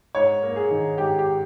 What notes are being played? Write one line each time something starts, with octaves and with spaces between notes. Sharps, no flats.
G#2 C#5
A#3
G#4
D#3
G#2 G4
G4